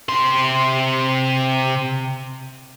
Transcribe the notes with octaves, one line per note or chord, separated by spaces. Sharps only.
C3 C6